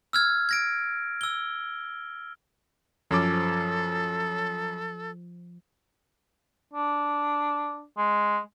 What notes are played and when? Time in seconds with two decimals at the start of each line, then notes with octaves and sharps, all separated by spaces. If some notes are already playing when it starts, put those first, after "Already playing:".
0.13 E6 F6 G#6
0.49 G#6 A#6 D7
1.21 E6 G7
3.11 F#2 F3 C#4 A4 D6
6.73 D4
7.97 G#3